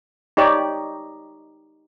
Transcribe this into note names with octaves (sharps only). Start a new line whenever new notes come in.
D#4 G4 C#5 D5